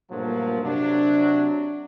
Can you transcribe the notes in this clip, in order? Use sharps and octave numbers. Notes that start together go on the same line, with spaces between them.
G2 A#2 F3 F#3 A3 A#3
C3 F#3 D4